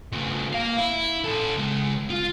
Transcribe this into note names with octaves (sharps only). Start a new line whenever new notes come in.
C#3 A3
A#3 F5
E4
C#4 A4
C#3 G#3
F4